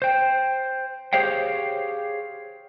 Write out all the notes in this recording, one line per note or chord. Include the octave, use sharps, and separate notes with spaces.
C5 G5
G4 G#4 C5 C#5 F5 G5